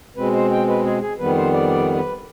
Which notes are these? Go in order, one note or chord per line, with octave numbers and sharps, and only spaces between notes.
B2 G#3 C4 B4
C5
G5
B4
G#4
G#4
F2 D#3 G3 B3 B4
C5
D5
D5
B4